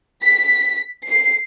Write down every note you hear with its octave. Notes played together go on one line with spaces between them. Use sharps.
B6
C7